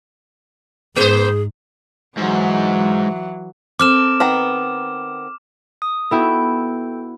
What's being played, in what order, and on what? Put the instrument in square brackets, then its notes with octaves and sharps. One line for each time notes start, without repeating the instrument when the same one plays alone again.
[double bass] G#2 [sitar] A#3 C5 [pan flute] G#4
[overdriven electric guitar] G#2 [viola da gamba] E3 F#3
[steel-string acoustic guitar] C4 A4 A#4 [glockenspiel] D6 F6 E7
[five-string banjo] D#3 B3 A#5
[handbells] D#6
[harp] B3 E4 F#4 [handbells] A4 G5 G6